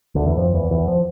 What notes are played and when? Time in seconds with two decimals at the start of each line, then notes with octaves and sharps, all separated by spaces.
0.15 D2 D3
0.26 E2 E3
0.37 F2 F3
0.54 E2 E3
0.70 E2 E3
0.88 F3